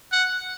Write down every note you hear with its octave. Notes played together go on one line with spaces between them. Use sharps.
F#5